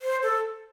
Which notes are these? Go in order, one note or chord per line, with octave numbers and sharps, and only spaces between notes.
C5
A4